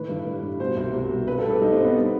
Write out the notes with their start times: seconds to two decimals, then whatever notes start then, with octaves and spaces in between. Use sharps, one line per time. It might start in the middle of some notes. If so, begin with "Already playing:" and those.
Already playing: A2 D#3 B4
0.09 G2
0.26 G3
0.43 G2
0.60 B2 C5
0.77 C2
0.94 C2
1.11 B2
1.28 G2 B4
1.39 A4
1.45 A3
1.50 G4
1.61 G2 D#4
1.73 C4
1.78 G2
1.84 B3